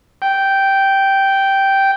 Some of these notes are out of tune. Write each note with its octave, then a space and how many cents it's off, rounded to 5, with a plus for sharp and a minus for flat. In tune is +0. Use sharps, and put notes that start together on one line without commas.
G5 -10